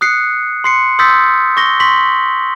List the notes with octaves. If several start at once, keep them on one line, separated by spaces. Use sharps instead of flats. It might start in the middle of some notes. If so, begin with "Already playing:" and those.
D#6 F#6 C7 C#7
C6 C7 C#7
C6 D#6 E6 G6 A6 B6
C#6 A#6 G7
C6 C#6 B6 F#7